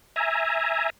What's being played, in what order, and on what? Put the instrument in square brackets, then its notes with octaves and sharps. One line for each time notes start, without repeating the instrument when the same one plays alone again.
[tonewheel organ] E5 G#5 A#5